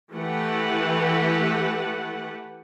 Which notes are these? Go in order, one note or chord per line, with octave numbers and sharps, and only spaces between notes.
E3 A3 G4 B4 F#5